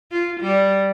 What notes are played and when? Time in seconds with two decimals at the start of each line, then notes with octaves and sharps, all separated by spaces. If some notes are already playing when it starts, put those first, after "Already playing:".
0.11 F4
0.41 G3